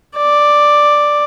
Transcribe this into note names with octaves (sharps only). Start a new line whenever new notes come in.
D5